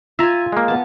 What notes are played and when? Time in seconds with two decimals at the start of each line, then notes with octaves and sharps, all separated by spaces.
0.19 F4 E5 G#5 A#5
0.52 G#3 A#3
0.68 B3 A5